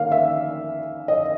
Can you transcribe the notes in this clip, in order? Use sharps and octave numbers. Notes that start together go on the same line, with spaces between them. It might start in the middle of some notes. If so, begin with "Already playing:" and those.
Already playing: D#3 A#3 F5
E5
D#5